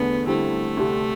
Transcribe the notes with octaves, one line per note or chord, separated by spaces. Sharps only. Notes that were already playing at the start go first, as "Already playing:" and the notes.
Already playing: E2 D3 A3 B3
D3 G3 A3 C4 E4
D2 C3 G3 D4